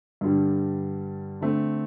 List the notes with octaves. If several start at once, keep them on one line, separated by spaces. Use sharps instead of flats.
G2 D3 G3
D3 A3 C4